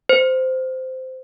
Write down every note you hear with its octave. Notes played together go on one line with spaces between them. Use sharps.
C5